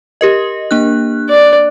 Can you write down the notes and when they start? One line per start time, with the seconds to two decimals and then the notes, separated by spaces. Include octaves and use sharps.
0.21 G4 A#4 D#5
0.71 A#3 D4 F#6
1.29 D5